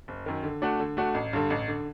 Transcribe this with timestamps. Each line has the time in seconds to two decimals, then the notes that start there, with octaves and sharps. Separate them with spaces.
0.08 F#1
0.26 F#2 D#3
0.43 D3
0.62 A3 D4 F#4
0.80 D3
0.97 A3 D4 F#4
1.14 A1
1.33 G2 D3
1.50 A1
1.68 D3